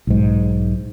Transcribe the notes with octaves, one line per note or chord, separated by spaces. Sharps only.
B1 G#2